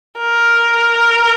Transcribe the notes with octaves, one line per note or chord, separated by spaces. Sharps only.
A#4